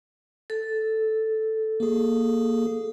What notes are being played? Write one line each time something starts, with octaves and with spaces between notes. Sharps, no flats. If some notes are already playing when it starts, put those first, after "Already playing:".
A4
A#3 G#4